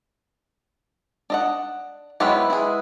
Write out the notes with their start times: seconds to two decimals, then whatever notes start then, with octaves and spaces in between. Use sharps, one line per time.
1.30 D4 D#5 F#5
2.20 F#3 G#3 B3 E4 G4 B4
2.36 F#5
2.50 E4 G#4